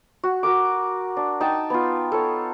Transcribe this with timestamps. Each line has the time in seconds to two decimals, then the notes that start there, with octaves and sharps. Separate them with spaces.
0.24 F#4
0.43 F#4 A#4 D6
1.17 D4
1.41 D#4 G5 A5
1.70 B3 F4
2.12 A4 C#5